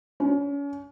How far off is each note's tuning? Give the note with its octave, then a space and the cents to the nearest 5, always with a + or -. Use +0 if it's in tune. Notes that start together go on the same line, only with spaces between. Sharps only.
C#4 +35